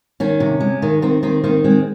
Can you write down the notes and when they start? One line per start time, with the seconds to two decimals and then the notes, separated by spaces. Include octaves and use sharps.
0.20 D#3 C#4
0.40 C3
0.60 G#3
0.82 D#3
1.02 D#3 C4
1.23 D#3 C4
1.44 D#3 C4
1.64 G#3 C4